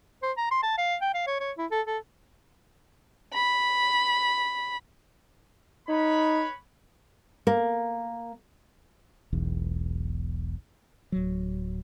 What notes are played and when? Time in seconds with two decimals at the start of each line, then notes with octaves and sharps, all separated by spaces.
0.23 C5
0.38 A#5
0.51 C6
0.63 A5
0.78 F5
1.01 G5
1.14 F5
1.27 C#5
1.40 C#5
1.58 E4
1.71 A4
1.87 A4
3.34 B5
5.89 D#4 B4 C#5 B5
7.47 A#3
9.32 E1 B1 E2
11.12 D1 F#3